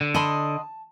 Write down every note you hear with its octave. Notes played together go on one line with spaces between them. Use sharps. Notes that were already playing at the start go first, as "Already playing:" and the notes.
D3
D#5 A5 B5 C6